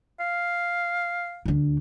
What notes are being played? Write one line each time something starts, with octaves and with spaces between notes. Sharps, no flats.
F5
D2 D4